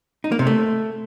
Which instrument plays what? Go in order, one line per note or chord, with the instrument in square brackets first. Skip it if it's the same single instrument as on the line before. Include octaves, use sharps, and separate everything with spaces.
[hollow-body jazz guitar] D#4
A#3
C3
A3